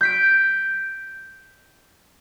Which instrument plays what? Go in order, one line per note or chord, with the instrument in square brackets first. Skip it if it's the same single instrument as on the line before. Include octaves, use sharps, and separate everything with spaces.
[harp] G6 B6 D7